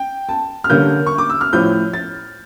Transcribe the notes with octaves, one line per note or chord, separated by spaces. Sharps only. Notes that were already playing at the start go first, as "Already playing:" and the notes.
Already playing: G5
A5
F6
D3 G3 A#3 C#4 G6
C#6
D6
E6
F6
A2 F3 C#4 G6
A6